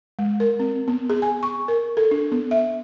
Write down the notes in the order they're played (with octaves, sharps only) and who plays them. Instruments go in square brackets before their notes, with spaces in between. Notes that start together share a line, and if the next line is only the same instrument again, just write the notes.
[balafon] G#3
A#4
C4
B3
G#4
G#5
C#6
A#4
A4
D4
B3
E5